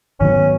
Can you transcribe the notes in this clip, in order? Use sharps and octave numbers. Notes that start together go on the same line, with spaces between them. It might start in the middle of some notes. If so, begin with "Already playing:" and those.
G#2 D#3 F#3 B3 C#4